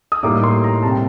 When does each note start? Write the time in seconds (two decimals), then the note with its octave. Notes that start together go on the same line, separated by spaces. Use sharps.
0.12 D#6
0.23 A2 G3 A#3 D#4 D6
0.44 C6
0.64 A#5
0.83 C3 G3 A#3 A5
0.90 G5